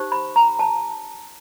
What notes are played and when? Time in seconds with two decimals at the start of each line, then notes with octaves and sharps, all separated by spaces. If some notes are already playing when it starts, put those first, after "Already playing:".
Already playing: D#4 G4 C5
0.12 B5
0.36 A#5
0.59 A5